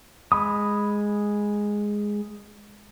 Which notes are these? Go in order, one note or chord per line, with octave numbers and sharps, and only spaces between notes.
G#3 B5 D#6